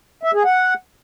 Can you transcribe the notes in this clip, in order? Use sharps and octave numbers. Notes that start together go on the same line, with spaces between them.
E5
G#4
F#5